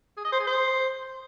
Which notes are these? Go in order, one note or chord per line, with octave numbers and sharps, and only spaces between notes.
G#4
D#5
C5
G#4
C5